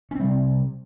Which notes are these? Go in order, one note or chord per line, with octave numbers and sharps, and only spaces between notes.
C3 G3 C4 C#4